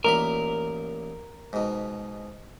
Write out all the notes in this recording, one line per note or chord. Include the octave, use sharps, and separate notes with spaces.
A1 A#2 A#4 B5
G#2 B2